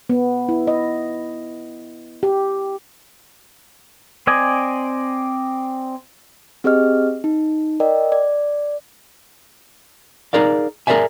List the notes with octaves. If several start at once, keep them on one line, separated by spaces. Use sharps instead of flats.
B3
E4
D#5
G4
C4 D5 D#5 G#5
C4 G4 G#4 D#5 F6
D#4
A#4 D5 D#5 G5
D5
D#4 G#4 A#4 D5 F5
G#4 A#4 C#5 D5 E5 G#5